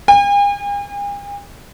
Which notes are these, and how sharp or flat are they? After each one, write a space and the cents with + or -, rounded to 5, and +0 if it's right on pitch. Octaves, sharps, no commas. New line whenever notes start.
G#5 -45